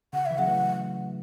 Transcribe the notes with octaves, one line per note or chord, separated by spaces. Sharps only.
C#3 F#5
E3 E5
C#3 F#3 F#5
E3 A3